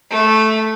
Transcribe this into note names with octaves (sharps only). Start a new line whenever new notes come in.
A3